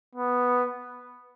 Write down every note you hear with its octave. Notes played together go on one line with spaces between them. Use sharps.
B3